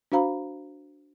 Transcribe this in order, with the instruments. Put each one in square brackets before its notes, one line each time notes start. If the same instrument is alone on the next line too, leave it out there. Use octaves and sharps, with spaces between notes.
[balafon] D4 F#4 C5 F5 A#5 B5